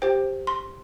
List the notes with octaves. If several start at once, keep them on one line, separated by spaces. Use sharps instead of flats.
G4 C5 G5
C6